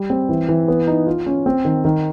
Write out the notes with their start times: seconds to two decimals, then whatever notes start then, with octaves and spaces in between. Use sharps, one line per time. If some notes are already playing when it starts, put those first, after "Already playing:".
Already playing: G3
0.10 C4
0.29 E3
0.49 E3
0.68 B3
0.87 D#4
1.07 F4
1.26 C#4
1.46 C4
1.65 D#3
1.85 D#3